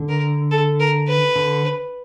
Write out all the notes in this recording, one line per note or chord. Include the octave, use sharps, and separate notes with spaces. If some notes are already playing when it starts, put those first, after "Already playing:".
Already playing: D3
A#4
A4
A#4
B4
D3